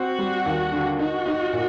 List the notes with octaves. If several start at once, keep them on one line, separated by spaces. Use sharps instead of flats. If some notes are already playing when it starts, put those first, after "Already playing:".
Already playing: C4 F#4
G3
D#2
D3
D#4 F#4
D#4
A#2